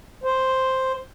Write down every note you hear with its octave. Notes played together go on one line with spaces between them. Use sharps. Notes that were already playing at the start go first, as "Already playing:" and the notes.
C5